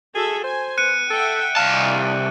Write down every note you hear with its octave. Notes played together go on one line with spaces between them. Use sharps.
F#4 G#4 A4 E5
C5 G#5
B3 F#6 C#7 D#7
A4 E5 F#5 G5
C2 D5 F5 G5 A5